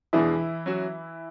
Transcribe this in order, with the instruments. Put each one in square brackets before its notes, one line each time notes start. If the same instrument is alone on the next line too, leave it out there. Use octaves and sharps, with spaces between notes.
[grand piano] E2 B2 G#3 D4 G#4 [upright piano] E3 E4
[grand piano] F#3 C#4 F#4